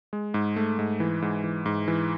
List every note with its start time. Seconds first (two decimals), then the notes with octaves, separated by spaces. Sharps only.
0.13 G#3
0.34 G#2
0.56 A3
0.79 G#2
1.00 E3
1.22 G#2
1.44 E3
1.66 G#2
1.88 E3